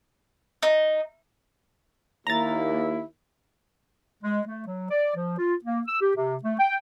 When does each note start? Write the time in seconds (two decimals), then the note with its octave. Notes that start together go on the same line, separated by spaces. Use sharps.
0.63 D#4
2.27 D#2 A#3 E4 A#5 A6
4.24 G#3
4.47 A3
4.67 F#3
4.90 D5
5.16 F3
5.39 F4
5.64 A#3
5.88 E6
6.01 G4
6.15 C3
6.44 A3
6.59 G5